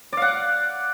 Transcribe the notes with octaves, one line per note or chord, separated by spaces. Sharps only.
D5 F5 F#5